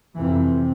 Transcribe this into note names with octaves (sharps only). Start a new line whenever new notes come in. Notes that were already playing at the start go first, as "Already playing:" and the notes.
F2 C3 E3